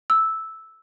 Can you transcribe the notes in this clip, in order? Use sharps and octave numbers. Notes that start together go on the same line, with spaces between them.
E6